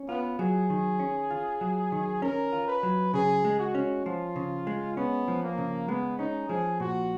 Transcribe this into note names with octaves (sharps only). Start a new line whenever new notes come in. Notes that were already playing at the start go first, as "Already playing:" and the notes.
Already playing: C#4
B3 F4
F#3 G#4
D#3
C#4
F4
F#3
D#3
C#4 A#4
F4
B4
F#3
C#3 G#4
G#3
F#4
C#4
F3 F4
C#3
G#3
B3 C#4
F3
A#3
C#3
G#3 B3
C#4 D#4
F3 G#4
A#2 F#4